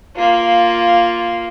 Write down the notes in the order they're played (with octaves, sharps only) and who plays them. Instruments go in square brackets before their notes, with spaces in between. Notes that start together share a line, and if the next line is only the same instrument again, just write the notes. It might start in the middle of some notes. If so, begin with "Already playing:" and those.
[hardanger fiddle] A#3 F4